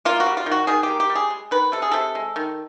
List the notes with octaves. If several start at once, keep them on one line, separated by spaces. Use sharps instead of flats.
A#3 F4
F#4
G3
F4
D#3
F#4
D#3 G#4
G4
A#3
G4
G3
G#4
G#3
D#3 B4
C3 A4
G#4
C3 A4
G#3
D#3